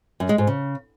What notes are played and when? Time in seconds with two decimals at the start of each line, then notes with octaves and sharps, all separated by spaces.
0.20 F#2
0.29 G#3
0.38 G#2
0.47 C#3